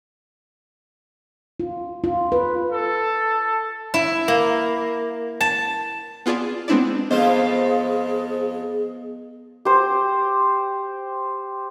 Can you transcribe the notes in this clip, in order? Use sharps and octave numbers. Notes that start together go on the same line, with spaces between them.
F4
F4
B4
A4
E4
A#3
A5
B3 F4 G#4 D5 A5
G#3 B3 C4 D4 E4 D5
F2 B3 F4 G#4 C5 D#5
G4 C5